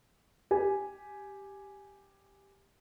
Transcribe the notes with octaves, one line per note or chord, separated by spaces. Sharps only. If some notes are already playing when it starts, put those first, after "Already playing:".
G4 G#5